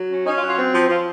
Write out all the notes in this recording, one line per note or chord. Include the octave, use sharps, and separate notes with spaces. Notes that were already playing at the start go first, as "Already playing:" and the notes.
Already playing: F#3
C#4
C#4 D#4
F4
F#3
F4
C4
F3
F3 F4